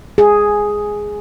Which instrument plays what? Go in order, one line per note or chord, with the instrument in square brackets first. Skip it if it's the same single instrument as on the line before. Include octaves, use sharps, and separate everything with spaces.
[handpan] G#4